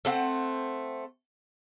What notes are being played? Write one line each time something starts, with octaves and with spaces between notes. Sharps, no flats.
A3 C4 F#5